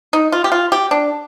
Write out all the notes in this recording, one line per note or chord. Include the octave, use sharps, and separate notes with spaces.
D#4
F4
G4
F4
G4
D4